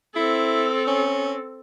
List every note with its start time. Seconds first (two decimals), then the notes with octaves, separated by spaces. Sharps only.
0.16 C4 E4 A4
0.87 C#4